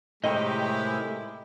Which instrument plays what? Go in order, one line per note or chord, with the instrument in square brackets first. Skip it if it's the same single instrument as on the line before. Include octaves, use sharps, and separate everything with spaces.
[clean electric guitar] A2 C3 D#3 [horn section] G#3 E4 G4 [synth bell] D#5